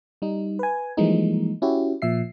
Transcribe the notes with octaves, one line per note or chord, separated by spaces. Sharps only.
G3 D#4
B4 G#5
E3 F3 G3 G#3 A#3 D#4
C#4 E4 F#4 G4
A#2 F3 E5 C7